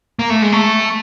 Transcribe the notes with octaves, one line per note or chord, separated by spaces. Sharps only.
A#3
A3
G#3
A3